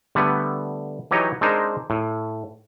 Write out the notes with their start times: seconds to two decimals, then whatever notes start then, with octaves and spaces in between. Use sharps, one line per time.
0.15 D3 G3 A3 B3
1.11 E3 F#3 D#4 G4 C#5 D#5
1.41 G#3 C4 D4 D#4 A#4 C5
1.90 A2